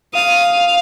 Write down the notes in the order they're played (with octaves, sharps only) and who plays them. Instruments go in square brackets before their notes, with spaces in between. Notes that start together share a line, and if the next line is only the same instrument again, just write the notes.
[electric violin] F5 [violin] D#6